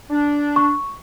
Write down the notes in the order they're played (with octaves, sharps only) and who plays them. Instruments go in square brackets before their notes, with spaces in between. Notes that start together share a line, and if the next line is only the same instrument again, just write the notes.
[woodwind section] D4
[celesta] C#6